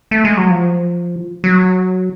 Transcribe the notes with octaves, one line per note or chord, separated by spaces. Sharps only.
A3
G#3
F#3
F3
F#3